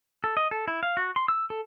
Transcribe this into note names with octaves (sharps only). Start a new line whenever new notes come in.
A4
D#5
A4
E4
F5
F#4
C6
E6
A4